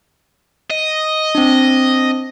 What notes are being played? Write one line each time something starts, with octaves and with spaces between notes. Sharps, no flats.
D#5
C4 D4